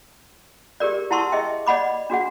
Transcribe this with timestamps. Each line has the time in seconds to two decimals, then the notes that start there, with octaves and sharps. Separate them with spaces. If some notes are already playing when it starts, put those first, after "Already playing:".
0.80 G4 G#4 A#4 D5
1.11 E4 F#5 A5 C6 C#6 E6
1.32 G#4 D#5 E5 G5
1.67 D5 D#5 F#5 B5 D6
2.10 D4 F#4 G#4 F#5